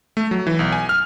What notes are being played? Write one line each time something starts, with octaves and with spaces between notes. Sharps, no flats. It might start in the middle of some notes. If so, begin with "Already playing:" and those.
A3
F#3
E3
B1
G#5
F6